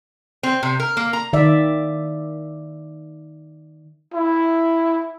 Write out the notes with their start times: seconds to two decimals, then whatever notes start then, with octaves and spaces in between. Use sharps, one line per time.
0.43 C4
0.63 C3
0.80 A#4
0.97 A#3
1.13 A#5
1.33 D#3 D5 E5
4.14 E4